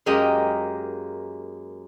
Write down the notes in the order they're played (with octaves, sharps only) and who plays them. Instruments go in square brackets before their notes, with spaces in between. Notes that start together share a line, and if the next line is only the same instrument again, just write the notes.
[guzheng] F#2 G#3 A#3 G4 A#4 D#5